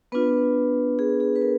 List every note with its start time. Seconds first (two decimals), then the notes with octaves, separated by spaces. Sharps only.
0.12 B3 D4 F4 B4
0.99 G#4
1.20 G#4
1.36 B4
1.42 A#4